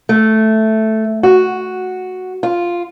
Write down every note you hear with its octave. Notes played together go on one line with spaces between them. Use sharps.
A3
F#4
F4